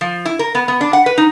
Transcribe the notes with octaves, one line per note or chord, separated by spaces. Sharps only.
F3
E4
A#4
B3
B3
D4
F#5
B4
D#4